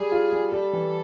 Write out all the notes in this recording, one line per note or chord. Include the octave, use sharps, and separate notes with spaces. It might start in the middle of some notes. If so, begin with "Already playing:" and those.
Already playing: G3 G#4
F4
G3
G3 A4
E3